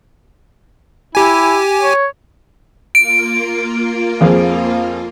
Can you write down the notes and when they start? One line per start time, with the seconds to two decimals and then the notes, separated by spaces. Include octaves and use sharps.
1.15 E4 G4 G#5
1.81 C#5
2.95 A#3 F4 D7
4.21 F2 F3 G#4